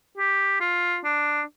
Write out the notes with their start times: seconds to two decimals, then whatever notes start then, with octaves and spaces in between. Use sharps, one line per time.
0.17 G4
0.60 F4
1.04 D4